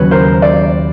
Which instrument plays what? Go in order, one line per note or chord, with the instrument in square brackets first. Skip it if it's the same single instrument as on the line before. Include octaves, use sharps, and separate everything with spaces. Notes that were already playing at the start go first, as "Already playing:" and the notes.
Already playing: [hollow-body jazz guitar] D#2 C#3 F#3 [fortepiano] B4 C#5
[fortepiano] A#4 C5
C5 D5